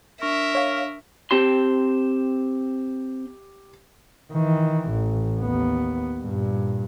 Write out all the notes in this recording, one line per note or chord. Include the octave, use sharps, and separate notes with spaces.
D4 A#4 E5 C#6
C#5 F5
C4 G4 A5 C6
D#3 E3
A1
D#2 B3
G2 A#2